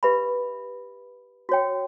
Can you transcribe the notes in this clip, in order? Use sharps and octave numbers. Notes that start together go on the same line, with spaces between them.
G4 B4 E5 B5
F#4 C#5 G5